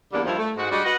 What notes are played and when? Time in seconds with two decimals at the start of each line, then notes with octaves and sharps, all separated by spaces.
0.13 E2 D3 G3 A#3 D4
0.25 G2 D#3 F3 E4 F4
0.39 A3
0.56 G#2 F#4
0.71 G3 G#3 D4 F#4
0.85 F#4 B4 D#5 F#5